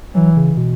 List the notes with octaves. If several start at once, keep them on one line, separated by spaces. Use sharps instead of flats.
E3 F#3
C#3
B2